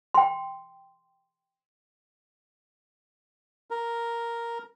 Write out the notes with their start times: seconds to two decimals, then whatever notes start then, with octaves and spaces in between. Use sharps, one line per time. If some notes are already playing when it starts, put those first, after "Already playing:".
0.14 G5 C6
3.70 A#4